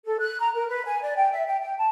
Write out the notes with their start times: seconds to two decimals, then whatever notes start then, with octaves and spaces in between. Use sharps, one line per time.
0.06 A4
0.20 F#6
0.39 A#5
0.54 A#4
0.68 B4
0.85 G#5
1.02 D5
1.17 G5
1.31 E5
1.46 G5
1.60 G5
1.78 A5